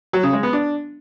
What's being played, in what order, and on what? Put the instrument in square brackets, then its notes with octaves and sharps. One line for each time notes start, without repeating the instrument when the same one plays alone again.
[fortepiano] F#3
C#3
G#3
B3
D4